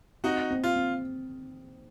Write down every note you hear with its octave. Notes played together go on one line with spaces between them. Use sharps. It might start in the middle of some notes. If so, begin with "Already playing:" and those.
C4 D#4 F#4
C4
F4
C4